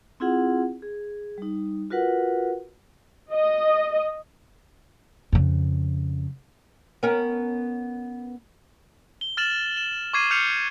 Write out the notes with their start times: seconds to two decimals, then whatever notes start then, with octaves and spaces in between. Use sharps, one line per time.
0.20 C4 E4 F4 G#4 F#5
0.82 G#4
1.38 G3 D#4
1.90 F4 F#4 A#4 B4 F#5
3.32 D#5
5.32 F2 C#3
7.03 B3 C#4 A#4
9.21 G7
9.37 F6 A6 E7 F#7
9.77 E7
10.13 C#6 D6 G#6 C7 D#7
10.31 F6 G6 C7 C#7 F7